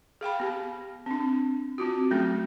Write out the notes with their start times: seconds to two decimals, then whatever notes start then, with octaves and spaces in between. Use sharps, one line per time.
0.21 G#4 F5 G5 B5
0.40 B3 G4
1.06 C4 D4
1.78 C4 F4 F#4
2.11 F#3 A3 C#4 G#4